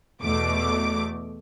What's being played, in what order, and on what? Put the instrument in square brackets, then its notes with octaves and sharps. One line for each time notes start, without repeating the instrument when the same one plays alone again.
[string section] E2 B2 A3 D6